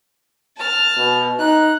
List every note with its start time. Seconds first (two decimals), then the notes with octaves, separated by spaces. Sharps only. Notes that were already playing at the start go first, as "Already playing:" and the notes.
0.58 A5 F6
0.97 B2
1.39 D#4 F#6